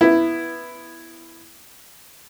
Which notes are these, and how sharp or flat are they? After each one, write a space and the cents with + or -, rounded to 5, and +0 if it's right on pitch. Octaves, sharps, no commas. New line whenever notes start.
B3 +0 E4 +5